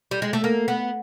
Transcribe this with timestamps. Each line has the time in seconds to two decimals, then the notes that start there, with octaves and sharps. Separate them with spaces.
0.11 G3
0.22 G#3
0.33 A3
0.44 A#3
0.68 B3